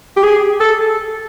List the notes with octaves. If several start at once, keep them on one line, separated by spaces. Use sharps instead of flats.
G4
G#4
A4